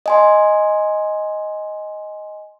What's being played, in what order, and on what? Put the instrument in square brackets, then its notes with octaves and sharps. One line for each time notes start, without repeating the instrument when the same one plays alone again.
[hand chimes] D#5 G#5 C6